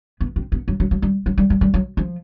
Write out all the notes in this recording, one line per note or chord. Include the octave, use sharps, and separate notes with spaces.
B3
C4
B3
F#3
F#3
F#3
G3
F#3
G3
G3
G3
F#3
F3